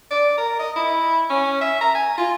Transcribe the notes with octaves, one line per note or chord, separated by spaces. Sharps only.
D5
A#4
D#5
E4
C#4
E5
A#5
G#5
F4